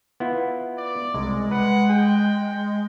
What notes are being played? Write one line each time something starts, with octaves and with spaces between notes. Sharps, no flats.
B3 E4 F4
D5
C2 G#3
B4 F#5
G#4 G5